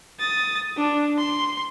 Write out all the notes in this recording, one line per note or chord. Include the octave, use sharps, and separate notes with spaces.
D#6 A6
D4
C6